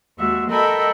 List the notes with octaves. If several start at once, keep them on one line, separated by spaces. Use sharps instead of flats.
D#2 G#3 F#4 E5
A4 A#4 D#5 E5 G5 B5